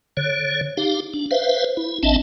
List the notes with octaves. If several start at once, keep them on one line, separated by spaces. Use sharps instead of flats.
D3 C#5
D#4 G4 F5
D4
B4 C5 E5 F5
E4
A1 C4 D4 D#5 E5 A5